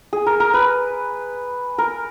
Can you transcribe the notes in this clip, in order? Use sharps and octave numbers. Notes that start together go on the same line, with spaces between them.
G#4
A#4
A#4
B4
A#4